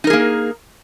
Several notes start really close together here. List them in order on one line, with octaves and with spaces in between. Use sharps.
D#4 A#4 G#4 A#3